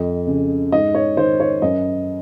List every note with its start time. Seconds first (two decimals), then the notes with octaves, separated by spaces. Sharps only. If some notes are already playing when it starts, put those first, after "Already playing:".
Already playing: F2 D#5
0.27 C#3
0.72 G#2 D#5
0.95 C#5
1.17 D#3 C5
1.40 C#5
1.62 F#2 D#5